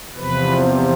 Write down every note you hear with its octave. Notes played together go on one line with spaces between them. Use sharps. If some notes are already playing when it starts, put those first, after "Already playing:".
E2 C3 F3 B4